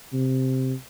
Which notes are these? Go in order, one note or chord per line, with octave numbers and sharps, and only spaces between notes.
C3